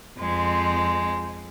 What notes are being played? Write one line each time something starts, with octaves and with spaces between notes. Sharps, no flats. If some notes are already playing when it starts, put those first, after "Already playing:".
F2 G#3 C4